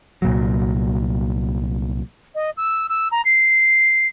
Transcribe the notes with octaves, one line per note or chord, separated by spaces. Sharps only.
C2 A#2 F#3
D#5
E6
E6
A#5
C7